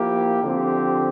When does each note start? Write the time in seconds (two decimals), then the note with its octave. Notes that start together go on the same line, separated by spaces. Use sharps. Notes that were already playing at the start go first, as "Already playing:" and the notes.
Already playing: F3 A#3 E4 G4
0.43 D3 F3 C4 G4